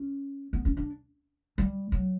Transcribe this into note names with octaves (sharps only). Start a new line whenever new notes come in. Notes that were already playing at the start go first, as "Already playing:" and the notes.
Already playing: C#4
B3
C#4
D4
G3
F#3